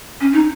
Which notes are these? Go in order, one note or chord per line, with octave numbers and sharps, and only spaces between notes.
C#4
D#4